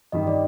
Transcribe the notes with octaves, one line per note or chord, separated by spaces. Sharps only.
G2 D#3 G3 D#5
D5